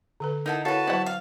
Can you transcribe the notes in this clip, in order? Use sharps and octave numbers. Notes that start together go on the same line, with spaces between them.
D3 A4 B4
D#4 E4 A#4 F#5 A5
E4 F#4 A4 B4 C#5 F5 A5
F#3 E4 B4 C5 D5 F#5
F5